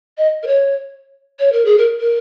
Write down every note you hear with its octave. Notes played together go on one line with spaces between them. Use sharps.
D#5
A#4
C#5
C#5
A#4
G#4
A#4
A#4